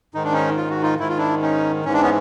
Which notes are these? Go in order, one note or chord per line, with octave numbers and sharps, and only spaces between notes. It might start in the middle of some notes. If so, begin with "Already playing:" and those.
G#2 D#3 D#4
D4
C#4 D#4
F4
F#4
D#4 F4
G#2 D#3 E4
F4
D4 E4
C#4 D#4
G#2 E3 C#4
D4
B3 C#4